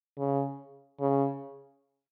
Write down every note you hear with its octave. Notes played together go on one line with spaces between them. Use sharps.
C#3
C#3